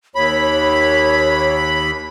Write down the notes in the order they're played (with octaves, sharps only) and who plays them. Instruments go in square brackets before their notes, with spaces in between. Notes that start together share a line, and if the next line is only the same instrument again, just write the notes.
[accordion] D#2 B5 [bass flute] C#5